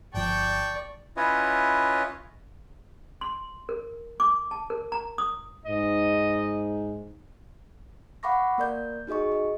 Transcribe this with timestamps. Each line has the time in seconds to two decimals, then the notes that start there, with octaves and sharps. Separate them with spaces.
0.14 G1 F3 D5 G5 A5 C#6
1.17 C#4 E4 F4 B4 C#5 D#5
3.21 C6
3.69 A#4
4.20 D6
4.51 A5
4.70 A#4
4.92 A#5
5.18 D#6
5.65 G#2 D#5
8.23 F5 F#5 B5 C#6 D6 A#6
8.58 A#3 A#4 D5 G6
9.07 D#4 F#4 G#4 D#5 C#6
9.32 D#5